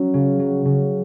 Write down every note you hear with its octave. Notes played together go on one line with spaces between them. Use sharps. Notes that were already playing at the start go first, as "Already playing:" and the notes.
Already playing: F#3 C#4 F#4
C#3
F#3
C#3